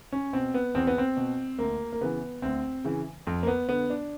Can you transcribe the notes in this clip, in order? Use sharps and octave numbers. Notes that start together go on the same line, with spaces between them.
C#4
B2 C4
B3
E2 C4
B3
C4
B2
D2 A#3
A#3
C#3 E3 B3
D2 C4
C#3 E3
F2
A#3
B3
D3 B3
D4